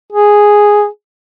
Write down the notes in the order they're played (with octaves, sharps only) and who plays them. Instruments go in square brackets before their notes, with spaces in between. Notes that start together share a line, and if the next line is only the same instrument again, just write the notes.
[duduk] G#4